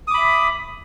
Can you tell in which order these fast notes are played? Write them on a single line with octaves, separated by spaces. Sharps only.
D#6 D6 B5 E5